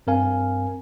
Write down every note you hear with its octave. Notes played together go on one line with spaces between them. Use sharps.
G2 C4 A#4 F5 G#5